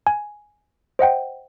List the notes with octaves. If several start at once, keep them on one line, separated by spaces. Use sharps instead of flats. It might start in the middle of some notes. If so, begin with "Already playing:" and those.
G#5
C5 D#5 F#5 G5